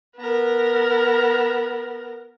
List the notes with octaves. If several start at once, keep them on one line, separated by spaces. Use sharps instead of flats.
B3 A#4